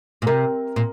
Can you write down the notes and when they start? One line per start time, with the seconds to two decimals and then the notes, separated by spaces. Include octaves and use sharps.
0.22 A#2
0.26 C3 A#4
0.76 A#2